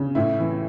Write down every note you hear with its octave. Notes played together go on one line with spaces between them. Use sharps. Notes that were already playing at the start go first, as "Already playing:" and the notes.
Already playing: C#3
A2 E4
E3